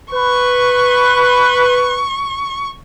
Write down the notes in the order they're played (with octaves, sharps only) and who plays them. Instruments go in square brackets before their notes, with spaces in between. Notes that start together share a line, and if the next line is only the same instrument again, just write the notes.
[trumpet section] B4 [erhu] C#6